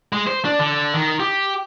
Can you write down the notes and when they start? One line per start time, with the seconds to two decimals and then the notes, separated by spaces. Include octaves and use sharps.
0.13 G#3
0.27 C5
0.45 D4
0.59 D3
0.94 D#3
1.20 G4